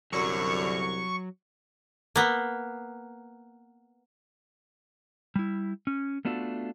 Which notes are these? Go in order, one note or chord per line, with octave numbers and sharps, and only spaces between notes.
C2 F#2 D3 F#3 C#6
A#3 B3
G3 E4
C#4
A3 B3 D4 F4 F#4 A4